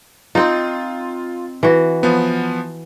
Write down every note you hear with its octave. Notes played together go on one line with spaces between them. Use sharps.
C4 D#4 F4
E3 F#4
F3 B3